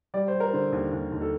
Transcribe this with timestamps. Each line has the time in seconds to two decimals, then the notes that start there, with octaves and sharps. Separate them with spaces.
0.14 G3 D5
0.28 C5
0.34 G3
0.40 A#4
0.53 D3 C5
0.72 D#2
0.92 D#2
1.12 D#2
1.21 A4